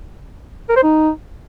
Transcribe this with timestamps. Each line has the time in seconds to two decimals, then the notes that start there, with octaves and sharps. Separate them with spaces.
0.69 A#4
0.76 C5
0.83 D#4